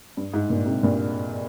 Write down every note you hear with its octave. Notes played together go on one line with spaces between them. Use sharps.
G2
G#2
G2 A#2
G#2 C3
G2 A#2